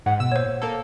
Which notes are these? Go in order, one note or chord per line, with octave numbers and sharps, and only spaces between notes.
G#2 F#5
B2 E6
A#2 C5 C#5
A#3 A4